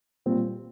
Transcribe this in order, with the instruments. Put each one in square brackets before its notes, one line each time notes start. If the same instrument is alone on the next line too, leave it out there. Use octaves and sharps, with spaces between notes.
[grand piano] A#2 G3 C4